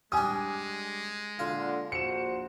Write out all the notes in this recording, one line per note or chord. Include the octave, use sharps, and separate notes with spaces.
G3 G#3 D4 G#5 D#6
A#2 D3 F4
A#1 F#4 C5 C#7 E7